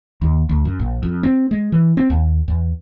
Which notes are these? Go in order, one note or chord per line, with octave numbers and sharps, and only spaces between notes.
D#2
D2
F#2
A#1
F2
C4
G#3
E3
C4
D#2
E2